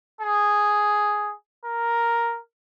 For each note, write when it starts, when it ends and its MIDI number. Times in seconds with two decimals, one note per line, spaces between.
0.21 1.32 68
1.65 2.39 70